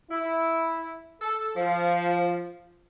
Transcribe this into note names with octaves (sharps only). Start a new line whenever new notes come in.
E4
A4
F3